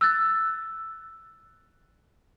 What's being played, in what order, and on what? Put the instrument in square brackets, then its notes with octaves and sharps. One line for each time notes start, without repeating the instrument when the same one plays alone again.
[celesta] E6 F#6 A6